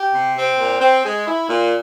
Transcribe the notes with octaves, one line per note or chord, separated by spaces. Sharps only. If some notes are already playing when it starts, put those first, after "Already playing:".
Already playing: G4
C3
C4
A#2
C4
G#3
E4
A#2